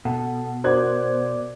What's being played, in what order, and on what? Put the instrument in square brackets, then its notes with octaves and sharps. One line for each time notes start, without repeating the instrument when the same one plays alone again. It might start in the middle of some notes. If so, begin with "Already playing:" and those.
[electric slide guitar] B2 [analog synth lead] A4 [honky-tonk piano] F#5
[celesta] F#4 A#4 F#5 [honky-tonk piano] C5 F#6 G#6 [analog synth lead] D5